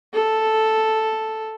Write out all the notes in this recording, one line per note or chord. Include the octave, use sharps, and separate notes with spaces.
A4